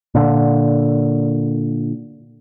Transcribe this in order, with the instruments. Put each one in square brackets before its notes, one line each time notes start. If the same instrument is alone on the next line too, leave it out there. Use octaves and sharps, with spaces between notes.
[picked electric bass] A#2 D3